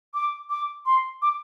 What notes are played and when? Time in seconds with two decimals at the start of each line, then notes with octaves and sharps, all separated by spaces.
0.14 D6
0.50 D6
0.86 C6
1.22 D6